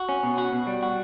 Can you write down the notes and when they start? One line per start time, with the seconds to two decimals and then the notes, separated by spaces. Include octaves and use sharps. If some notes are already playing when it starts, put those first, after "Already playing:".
Already playing: F#4
0.09 C#4
0.23 B2
0.38 F#4
0.53 B2
0.67 G3
0.83 F#4